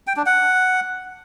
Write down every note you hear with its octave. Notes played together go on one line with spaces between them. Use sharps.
G5
D4
F#5